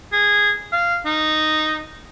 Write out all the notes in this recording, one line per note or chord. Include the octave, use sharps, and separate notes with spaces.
G#4
F5
D#4